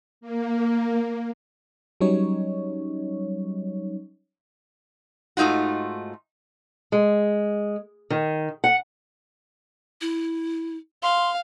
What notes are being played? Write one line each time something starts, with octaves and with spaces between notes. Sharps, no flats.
A#3
F#3 G3 C#4 D#4 C#5
G#2 A3 D#4 F4 F#4
G#3
D#3
F#5
E4
F5 C6